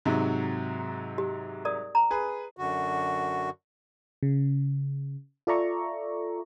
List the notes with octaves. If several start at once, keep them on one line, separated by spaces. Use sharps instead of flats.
G#2 C3 F#3
G4
A#4 D5 D#6
A#5
G#4 B4
F#2 D3 F#4
C#3
F4 A4 D5 E5 A#5 C#6